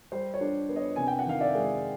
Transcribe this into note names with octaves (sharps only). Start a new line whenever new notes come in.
G3 C5
C#5
D4
B3
C#5 D#5
C3 G#5
G5
F#5
D#3 F5
D5 E5
G#3